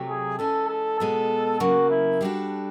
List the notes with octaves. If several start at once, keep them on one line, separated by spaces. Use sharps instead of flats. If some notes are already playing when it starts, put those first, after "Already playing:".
Already playing: C3 F#3 A3
G#4
E3 G#3 C#4 A4
A4
B2 G#3 B3 A4
C#3 F#3 A#3 F#4
E4
G3 B3 D4 F#4 A4